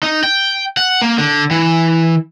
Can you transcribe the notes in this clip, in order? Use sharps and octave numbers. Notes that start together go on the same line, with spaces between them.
D#4
G5
F#5
A#3
D3
E3